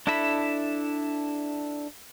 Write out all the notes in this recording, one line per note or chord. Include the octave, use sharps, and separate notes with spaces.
D4 E4 A4 E5 B5